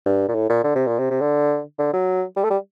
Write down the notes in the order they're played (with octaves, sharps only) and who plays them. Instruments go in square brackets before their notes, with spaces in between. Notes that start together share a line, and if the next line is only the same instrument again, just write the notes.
[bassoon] G2
A#2
A2
A#2
D3
C3
A#2
C3
C3
D3
D3
F#3
G3
A3
G3